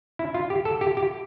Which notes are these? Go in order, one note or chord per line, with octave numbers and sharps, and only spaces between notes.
E4
F4
G4
A4
G4
G4